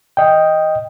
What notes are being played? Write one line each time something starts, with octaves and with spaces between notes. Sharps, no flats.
D#5 G5